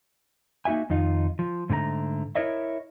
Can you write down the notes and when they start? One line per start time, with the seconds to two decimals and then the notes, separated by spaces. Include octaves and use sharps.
0.65 A#3 D#4 F#4 E5 G#5
0.90 F2 D#3 D#4 F4
1.39 F3
1.70 G#2 D3 A3 A4 A#5
2.35 E4 G4 A#4 C#5 D#5 E5